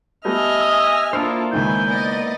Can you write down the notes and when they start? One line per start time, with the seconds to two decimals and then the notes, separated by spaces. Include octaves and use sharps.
0.25 G3 A3 B3 D#5 E5 G#5 F6
0.61 D#6
1.13 A#3 D4 E4 F4 A4 C5 D#6 F6
1.53 C#2 D#3 B4 G#5 G6
1.87 B3 D5 D#5